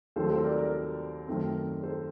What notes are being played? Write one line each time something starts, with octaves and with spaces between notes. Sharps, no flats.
D#2 D#3 F#3 A3 C4 A4 C5
A4 C5
A#4 D5
A#4 D5
F#2 D#3 A3 C4
A4 C5